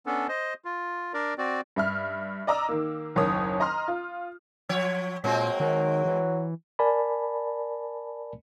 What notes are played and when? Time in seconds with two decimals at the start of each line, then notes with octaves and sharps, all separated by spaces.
0.06 B3 C#4 D4 A4
0.29 C5 D#5
0.65 F4
1.14 D4 A#4 D5
1.38 C4 F#4 D5
1.76 G2 E5 F6
2.47 D5 D#5 A#5 D6 E6
2.69 D#3 A#3
3.16 F#1 D#2 D#3 C#5 D#6
3.60 D#5 A#5 C6 F6
3.88 F4
4.69 F3 C#5
5.24 A#2 F#3 G#3 A#3 C4
5.60 D#3 F#3
6.06 E3
6.79 A#4 D5 G#5 A5 B5